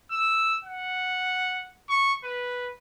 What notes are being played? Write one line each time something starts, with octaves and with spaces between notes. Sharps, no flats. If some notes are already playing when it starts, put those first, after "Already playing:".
E6
F#5
C#6
B4